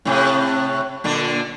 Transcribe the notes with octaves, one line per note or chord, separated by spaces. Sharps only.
A2 C3
A#2 D3 D4